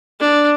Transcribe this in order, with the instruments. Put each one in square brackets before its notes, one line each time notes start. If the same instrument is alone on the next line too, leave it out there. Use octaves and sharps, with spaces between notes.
[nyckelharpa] D4